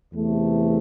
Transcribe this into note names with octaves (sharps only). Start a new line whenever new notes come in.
E2 C3 E3 A3